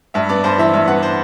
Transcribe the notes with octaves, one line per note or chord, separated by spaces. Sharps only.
G2 E5
B3 D5
G2 C5
E3 E5
G2 E5
B3 F#5
C5